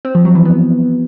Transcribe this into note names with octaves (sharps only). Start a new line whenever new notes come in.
C4
F3
F#3
E3
B3